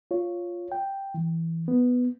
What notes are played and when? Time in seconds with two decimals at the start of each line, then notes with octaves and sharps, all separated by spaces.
0.11 F4 C#5
0.72 G5
1.14 E3
1.68 B3